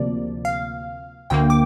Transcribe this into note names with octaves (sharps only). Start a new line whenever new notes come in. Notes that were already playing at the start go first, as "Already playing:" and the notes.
Already playing: D2 C3 F3 A#3 D5
F5
D2 D3 A#3 G5
D6